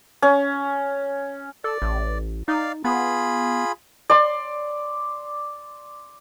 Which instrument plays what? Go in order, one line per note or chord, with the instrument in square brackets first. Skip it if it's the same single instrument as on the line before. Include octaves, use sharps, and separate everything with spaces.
[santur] C#4
[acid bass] A4 [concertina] D5
[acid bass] A1
[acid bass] D#4 [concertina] D5 F5
[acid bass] B3 [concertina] F4 G#4 B5
[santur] D5 C6